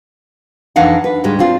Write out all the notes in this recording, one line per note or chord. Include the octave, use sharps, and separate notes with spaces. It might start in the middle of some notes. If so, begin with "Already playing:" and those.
F2 E3 D4 D#4 F5 F#5
B4
D2 G#2 G3 G#3 D#4
C4 D4 F4